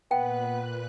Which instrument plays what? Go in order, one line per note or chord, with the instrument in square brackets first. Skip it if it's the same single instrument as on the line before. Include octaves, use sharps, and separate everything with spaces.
[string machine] A#2 B4 F#6 [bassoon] B3 [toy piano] G5